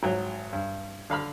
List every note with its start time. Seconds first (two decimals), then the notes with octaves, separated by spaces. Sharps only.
0.03 G#1 F#3
0.53 G2
1.10 D3 F5 B5 F6